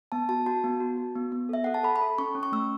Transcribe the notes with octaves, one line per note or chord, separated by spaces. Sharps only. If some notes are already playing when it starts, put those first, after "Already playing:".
B3 A5
F#4 A5
F#4 A5
B3
F#4
F#4
B3
B3
A4 E5
A4 F#5
A5
A4 B5
B5
A4
C#4 C#6
C#4
C#6
A3 E6